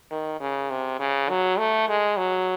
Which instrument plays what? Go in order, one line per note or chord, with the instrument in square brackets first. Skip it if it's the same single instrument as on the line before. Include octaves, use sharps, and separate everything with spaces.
[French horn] D#3
C#3
C3
C#3
F#3
A3
G#3
F#3